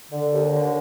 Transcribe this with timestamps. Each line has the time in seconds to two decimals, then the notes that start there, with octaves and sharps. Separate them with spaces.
0.10 D3
0.30 D#2
0.51 D3